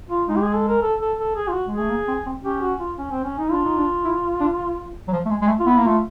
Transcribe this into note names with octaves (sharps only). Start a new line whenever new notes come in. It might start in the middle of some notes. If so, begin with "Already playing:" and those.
F4
G#3 D#4
G4
G#4
A4
A#4
A4
A4
A4
G#4
F4
F#4
G#3
G#4
A3
A#3
C4
C4
C#4 G4
F#4
F4
C#4
C4
C#4
D#4
D4 F4
D#4
D4
E4
D4
F#3
F3
A3
G#3
G#3
A3
F4
B3 E4
A#3
A3 F4